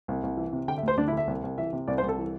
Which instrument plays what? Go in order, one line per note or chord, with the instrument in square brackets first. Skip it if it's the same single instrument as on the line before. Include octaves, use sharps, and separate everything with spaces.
[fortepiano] C2
C2
E3
C3
D3 G5
E5
D2 C5
D2 D4
E4
D3 E5
C2
C2
E3 E5
C3
C2 D5
C5
C2
A4
E3